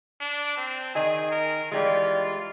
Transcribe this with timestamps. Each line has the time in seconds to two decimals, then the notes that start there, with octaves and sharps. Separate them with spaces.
0.21 D4
0.57 C4
0.95 D#3 G#4 D#5 G#5
1.31 A#4
1.72 E3 G3 G#3 F4